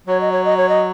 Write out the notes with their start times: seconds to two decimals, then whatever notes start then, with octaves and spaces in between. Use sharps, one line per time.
0.07 F#3 C#5
0.20 D#5
0.32 C#5
0.45 D#5
0.57 C#5
0.69 D#5